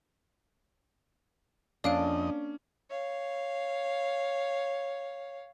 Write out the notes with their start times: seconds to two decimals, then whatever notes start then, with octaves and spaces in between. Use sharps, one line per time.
1.84 F2 A#3 C#4 D4 D5 D#5 F5 D7
2.90 C#5 F5